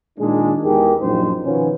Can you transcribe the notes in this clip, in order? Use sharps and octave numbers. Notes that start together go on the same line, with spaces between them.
A#2 D#3 G#3 D4 D#4 G#4
E2 G#3 D#4 G4 G#4 A#4
A#1 F#2 D#4 C5
B2 D#3 F3 B3 C#4